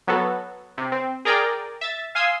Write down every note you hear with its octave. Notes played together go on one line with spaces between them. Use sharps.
F#3 B3 F#4 A4
C3
C4
G#4 A#4 D5 G5 G#5 A#5
E5 A6
F5 G#5 C6 D#6 E6 G#6